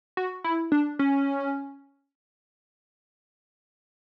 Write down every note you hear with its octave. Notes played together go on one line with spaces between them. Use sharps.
F#4
E4
D4
C#4